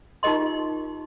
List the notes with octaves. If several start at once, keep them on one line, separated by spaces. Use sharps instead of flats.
D#4 F4 G4 A#4 D#5 C6